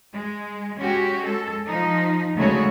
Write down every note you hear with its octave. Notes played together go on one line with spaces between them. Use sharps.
G#3
G#3 C#4 F#4 G4
G#3 A4
F3 D#4
D2 C#3 G#3 A3 F#4 C#5